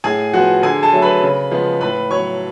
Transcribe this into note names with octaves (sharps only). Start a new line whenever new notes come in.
A2 G#4 G#5
F3 B3 F#4 F#5
D3 G#4 G#5
A4 A5
F#3 A3
B4 B5
C#3
F3 G#3 B3
A2 B4 B5
F#3 B3 C#5 C#6